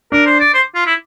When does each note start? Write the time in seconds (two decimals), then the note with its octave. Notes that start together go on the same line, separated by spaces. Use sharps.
0.12 D4 A#4
0.26 C5
0.40 D5
0.54 C5
0.75 F4
0.86 E4